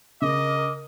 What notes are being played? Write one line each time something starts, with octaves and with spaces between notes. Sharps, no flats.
C#3 A#4 D#5 D6